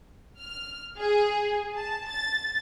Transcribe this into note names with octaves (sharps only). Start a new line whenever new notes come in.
F6
G#4
A5
A6